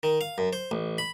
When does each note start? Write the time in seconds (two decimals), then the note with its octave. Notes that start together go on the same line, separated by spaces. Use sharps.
0.03 D#3
0.21 F5
0.38 F#2
0.53 C5
0.71 A1
0.98 B5